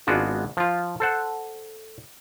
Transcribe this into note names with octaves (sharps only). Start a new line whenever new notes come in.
G#1 G#3 B3 D4 F4 F#4
F3 F4
A4 C5 F#5